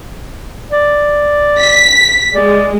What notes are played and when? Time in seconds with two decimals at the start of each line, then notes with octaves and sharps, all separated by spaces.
0.72 D5
1.60 B6
2.35 G#3 D5